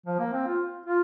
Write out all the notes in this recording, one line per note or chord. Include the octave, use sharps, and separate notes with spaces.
F3
A#3
C4
F4
F4